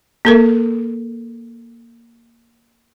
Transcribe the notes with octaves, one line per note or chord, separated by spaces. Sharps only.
A#3 A4 A#4